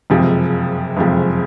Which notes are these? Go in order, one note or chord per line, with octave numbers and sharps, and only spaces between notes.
F#1 F2 C3 F3 G#3
F#1 F2 C3 F3 G#3